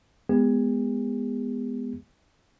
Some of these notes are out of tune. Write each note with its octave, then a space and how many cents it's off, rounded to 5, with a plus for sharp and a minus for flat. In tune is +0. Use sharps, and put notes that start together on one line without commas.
G#3 +0 B3 +0 G#4 -45